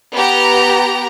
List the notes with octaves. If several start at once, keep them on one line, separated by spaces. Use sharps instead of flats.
B3 G4 A#5